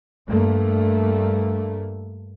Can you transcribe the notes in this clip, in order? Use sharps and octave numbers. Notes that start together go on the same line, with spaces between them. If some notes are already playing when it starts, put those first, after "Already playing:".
G2 A3 A#3